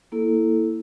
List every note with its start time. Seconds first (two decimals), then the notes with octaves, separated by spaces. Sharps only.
0.12 A#3 E4 A4